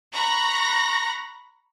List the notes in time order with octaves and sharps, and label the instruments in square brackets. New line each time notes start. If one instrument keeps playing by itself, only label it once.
[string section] A#5 B5 C#6 F#6 A#6